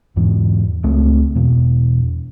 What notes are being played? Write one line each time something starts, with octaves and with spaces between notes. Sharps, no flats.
E2 G#2 E3
C#2 A3 C4
E2 B2